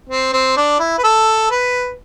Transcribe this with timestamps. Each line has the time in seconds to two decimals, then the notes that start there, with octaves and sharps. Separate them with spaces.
0.09 C4
0.33 C4
0.57 D4
0.79 E4
0.98 B4
1.04 A4
1.51 B4